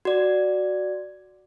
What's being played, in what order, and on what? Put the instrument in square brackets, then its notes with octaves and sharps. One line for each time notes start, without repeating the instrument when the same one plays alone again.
[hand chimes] F#4 D5